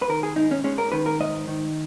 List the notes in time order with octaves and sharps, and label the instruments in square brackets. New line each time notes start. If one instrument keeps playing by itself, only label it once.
[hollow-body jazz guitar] B4
D#3 A#4
G#4
G#2 D#4
C#4
G#3 C#4
A#4
D#3 B4
A#4
G#2 D#5
D#3